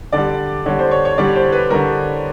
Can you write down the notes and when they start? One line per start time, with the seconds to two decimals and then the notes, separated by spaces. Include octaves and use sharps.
0.12 D3 G3 D5
0.66 D3 G3 C#5
0.79 C5
0.91 C#5
1.05 C#5
1.18 D3 G3 D5
1.36 C5
1.52 B4
1.70 D3 G3 A#4